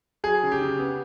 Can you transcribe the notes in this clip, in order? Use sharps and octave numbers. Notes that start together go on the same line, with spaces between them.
F#3 G#4
C#3
G4
C#3
B3